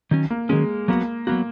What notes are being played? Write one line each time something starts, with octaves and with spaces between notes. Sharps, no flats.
D#3 F#3 C#4
A#3
D#3 F#3 G#3 C#4
F#3 A#3 B3 F#4
F#3 A#3 B3 F#4